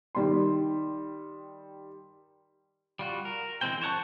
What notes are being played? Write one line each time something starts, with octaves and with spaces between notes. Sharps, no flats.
D#3 G3 C6
G3 F4 F#4
A#4
E3 G#3 C4 C5 G5
C5 C#5 F#5 A5 C#6